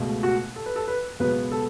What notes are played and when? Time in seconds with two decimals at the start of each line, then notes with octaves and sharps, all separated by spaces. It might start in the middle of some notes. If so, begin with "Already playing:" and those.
Already playing: C#2 B2 A3
0.23 F#4
0.56 A4
0.66 B4
0.76 A4
0.87 B4
1.19 C#2 B2 F#3 B3 B4
1.52 A4